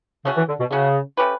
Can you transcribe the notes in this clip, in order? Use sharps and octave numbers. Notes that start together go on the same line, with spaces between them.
C#3 A3 C#4 F#4
E3
D3
B2
C#3 A3 C#4 F#4
A3 C#4 G4 B4